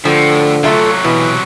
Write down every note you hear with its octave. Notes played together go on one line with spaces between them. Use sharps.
A2 D3 F3
C3 F#3 A3 F4
B2 E3